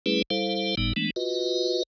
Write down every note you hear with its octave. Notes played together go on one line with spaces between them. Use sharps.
G3 A3 C#4 E4 G#4 B4
G3 E4 A4 C5 F5
G1 A2 G3 B3 D#4
E3 G#3 A3 B3 D4
F4 F#4 B4 D#5